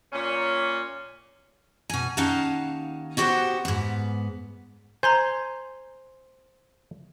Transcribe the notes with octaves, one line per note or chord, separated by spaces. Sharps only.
A#2 C#4
B2 G#5
D#2 C#4 D#4 F5 F#5 A5
B3 F#4 G4 C5 F#5
G#2 B3
C5 G#5 A#5 C6 G6